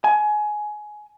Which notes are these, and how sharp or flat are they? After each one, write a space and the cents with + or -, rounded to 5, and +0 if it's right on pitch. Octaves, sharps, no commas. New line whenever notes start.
G#5 +20